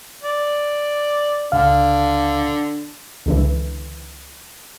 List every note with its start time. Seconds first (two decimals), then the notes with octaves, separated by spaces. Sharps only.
0.23 D5
1.52 C#2 D3 F5
3.26 C#2 D3 E3